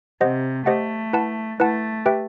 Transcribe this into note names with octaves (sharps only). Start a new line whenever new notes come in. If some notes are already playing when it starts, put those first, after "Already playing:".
C3 G4 C5 D#5 F#5
A3 G4 C5 D#5 F#5
E4 B4 F#5 A5
A3 E4 B4 F#5 A5
G4 B4 E5 G5